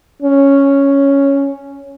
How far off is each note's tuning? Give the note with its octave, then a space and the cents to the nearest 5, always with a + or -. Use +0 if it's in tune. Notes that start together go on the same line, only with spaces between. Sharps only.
C#4 +0